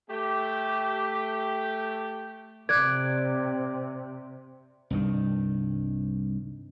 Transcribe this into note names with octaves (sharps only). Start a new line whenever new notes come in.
A3 G4
C3 D5 F#6 G#6
C2 G2 D#3